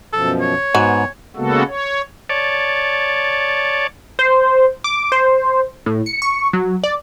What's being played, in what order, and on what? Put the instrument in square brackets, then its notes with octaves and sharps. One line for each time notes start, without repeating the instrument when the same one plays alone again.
[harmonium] F#2 B2 F3 [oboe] A4
[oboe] C#5
[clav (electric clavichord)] G#2 [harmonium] B3 [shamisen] F#4
[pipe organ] C#3 G#3 A#3 B3 F#4 A4
C#5
[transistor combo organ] C#5 D5 A5
[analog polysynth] C5
D6
C5
A2
C#7
C#6
F#3
D5